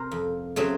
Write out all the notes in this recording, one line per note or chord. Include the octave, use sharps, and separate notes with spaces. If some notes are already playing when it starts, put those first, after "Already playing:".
Already playing: C3 A#4 C5
F2
C#3 F#3 A3 C4